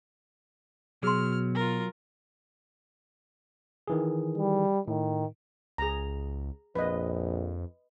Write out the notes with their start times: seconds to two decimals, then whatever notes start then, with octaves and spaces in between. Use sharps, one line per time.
1.03 B2 F#3 G#4 C6 F6
1.55 F4 A#4
3.88 D#3 E3 G#4
4.38 G3
4.88 A2 D#3
5.78 C#2 G#4 A#5
6.75 A#1 F2 B4 D#5